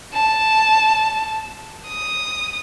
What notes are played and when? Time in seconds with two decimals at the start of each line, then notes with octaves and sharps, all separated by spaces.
0.14 A5
1.88 D#6